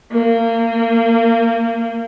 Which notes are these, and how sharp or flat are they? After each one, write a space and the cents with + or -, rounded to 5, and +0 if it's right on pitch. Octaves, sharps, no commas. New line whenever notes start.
A#3 -30